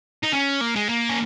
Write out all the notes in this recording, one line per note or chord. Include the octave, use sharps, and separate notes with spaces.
D#4
C#4
A#3
G#3
A#3
C#4